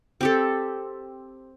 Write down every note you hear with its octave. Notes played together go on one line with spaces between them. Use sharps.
C4 G4 A4